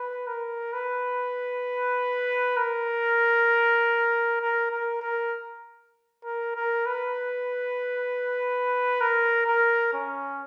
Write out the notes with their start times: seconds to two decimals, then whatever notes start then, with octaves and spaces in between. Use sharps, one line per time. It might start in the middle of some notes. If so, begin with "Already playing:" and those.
Already playing: B4
0.27 A#4
0.73 B4
2.57 A#4
4.42 A#4
4.71 A#4
5.02 A#4
6.25 A#4
6.56 A#4
6.86 B4
9.01 A#4
9.46 A#4
9.93 C#4